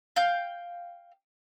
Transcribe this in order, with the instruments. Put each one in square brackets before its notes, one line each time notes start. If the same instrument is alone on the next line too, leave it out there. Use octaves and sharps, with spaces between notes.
[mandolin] F5 G5 G6